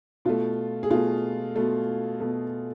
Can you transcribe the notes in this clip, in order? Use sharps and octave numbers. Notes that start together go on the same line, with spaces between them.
B2 A3 F4
G#4
B2 A3 F4
B2 A3
B2 A3